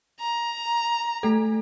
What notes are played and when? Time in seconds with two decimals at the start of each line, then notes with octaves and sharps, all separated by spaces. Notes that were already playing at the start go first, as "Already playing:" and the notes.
0.20 A#5
1.23 A3 A4